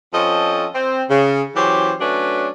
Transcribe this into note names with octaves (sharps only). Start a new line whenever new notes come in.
F3 C4 C#4 A4 D#5
C4
C#3
E3 F#3 C#4 G4 C5
F#3 A3 C#4 D4 B4